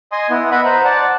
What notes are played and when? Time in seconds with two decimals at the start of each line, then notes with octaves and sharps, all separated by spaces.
0.12 D#5 G#5 C6 D#6
0.30 B3 E4
0.51 B4 D#5 E5 F#5 B5
0.65 C5 A#5
0.85 D5 F#5 A5